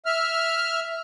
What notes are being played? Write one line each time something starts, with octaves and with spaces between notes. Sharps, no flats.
E5 F6